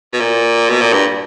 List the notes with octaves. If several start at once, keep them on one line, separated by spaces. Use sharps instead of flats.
B2
A#2
B2
A#2
G2